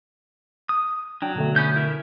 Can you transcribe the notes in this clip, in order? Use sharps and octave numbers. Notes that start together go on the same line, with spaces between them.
D#6
F#3 D4 G5
B2 D3 A3
B3 C#4 G6
E4 A#4 E5